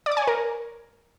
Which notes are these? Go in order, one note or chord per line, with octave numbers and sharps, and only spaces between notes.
D5
D6
G#5
C#5
A#4